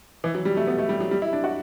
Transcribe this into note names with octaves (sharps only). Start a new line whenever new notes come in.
E3
F#3
G3
A3
B3
A3
G3
F#3
G3
E4
D4
F#4